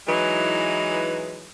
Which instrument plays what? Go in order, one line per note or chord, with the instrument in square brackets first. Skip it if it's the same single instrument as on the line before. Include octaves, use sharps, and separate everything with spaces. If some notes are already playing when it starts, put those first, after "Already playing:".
[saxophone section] E3 F#3 G#3 D#4 E4 B4